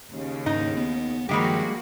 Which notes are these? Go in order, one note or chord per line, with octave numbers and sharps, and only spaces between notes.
D#2 C#3
G#2 D#4
B3
G2 D#3 F3 G3 G#3 A#3 F#4 G4